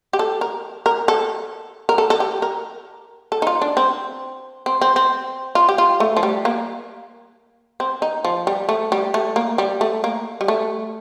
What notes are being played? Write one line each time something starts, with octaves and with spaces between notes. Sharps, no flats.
G4
A4
A#4
A#4
A4
A#4
A4
A4
G4
A#4
A4
D#4
F4
D4
C4
C4
C4
C4
F4
G4
F4
A3
F3
G3
A#3
C4
D#4
F3
G3
A3
G3
A3
A#3
G3
A3
A#3
G3
A3